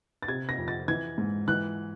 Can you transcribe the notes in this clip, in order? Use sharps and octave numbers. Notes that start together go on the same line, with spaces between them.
A6
C3 G#6
A#6
F2
A6
E3 G#6
G#2
E3 F#6